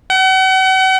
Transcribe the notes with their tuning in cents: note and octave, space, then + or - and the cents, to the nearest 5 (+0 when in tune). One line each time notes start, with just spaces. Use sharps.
F#5 +40